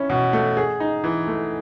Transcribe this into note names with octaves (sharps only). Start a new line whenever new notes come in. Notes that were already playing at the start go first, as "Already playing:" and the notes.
Already playing: C#4 E4
B2
A3
G#4
D#4
E3
A3